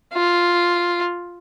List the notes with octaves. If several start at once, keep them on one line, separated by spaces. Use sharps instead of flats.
F4